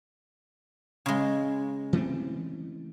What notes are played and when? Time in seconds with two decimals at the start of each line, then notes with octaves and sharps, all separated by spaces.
1.06 C#3 G#3
1.93 E3 A3 C4